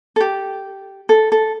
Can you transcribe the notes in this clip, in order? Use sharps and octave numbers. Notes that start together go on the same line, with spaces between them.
A4
G4
A4
A4